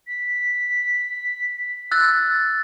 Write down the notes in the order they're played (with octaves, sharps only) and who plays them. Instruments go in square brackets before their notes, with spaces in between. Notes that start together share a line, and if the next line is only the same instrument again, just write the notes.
[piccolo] B6
[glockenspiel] E6 F#6 A6